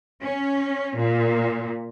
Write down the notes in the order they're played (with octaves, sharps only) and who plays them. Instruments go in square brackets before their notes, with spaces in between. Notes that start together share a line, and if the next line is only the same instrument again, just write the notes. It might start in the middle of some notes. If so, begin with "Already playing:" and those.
[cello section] C#4
A#2